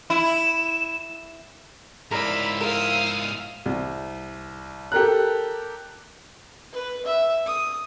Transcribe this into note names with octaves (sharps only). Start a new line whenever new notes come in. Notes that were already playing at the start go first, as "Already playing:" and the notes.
E4 E7
G#2 E4 F4 A#4 D5 B5 E6
A#4 F5 D#6
C2
G4 A4 A#4 A#5 F#6
B4
E5
D#6